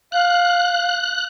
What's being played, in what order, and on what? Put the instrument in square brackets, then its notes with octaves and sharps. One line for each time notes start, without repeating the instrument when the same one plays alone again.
[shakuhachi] F5 [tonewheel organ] F#6